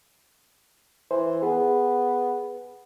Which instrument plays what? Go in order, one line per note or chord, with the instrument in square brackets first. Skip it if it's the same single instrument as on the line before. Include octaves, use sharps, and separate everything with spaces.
[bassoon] E3 [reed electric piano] C5
[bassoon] B3 [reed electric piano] G#4